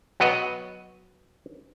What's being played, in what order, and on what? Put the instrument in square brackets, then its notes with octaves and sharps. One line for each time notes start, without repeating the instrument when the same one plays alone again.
[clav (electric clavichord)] F#3 B3 F#4 B4 D#5